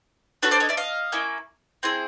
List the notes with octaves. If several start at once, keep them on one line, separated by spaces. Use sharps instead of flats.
D4 F#4 A4 B4 C#5
C5 D5
C#5 D#5
D5 E5
D#5 F5
A#3 C#4 E4
C4 E4 G#4